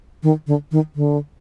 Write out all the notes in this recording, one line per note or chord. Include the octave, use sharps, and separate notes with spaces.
D#3
D3
D#3
D3